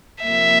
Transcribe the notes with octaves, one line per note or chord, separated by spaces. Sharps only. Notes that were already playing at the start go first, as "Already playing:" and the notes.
C3 F3 A#3 E5